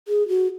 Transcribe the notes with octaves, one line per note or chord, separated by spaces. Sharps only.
G#4
F#4